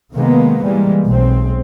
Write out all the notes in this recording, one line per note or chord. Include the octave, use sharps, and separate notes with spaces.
C3 D#3 G#3 A#3 B3
E3 G3 G#3 A#3
B1 G#3 C4